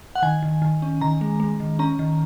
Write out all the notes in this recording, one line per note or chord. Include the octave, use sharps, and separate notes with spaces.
F#5
D#3 G#5
D#3
D#3
C#4
D#3 A#5
G#3
G#3
D#3
C#4 A#5
D#3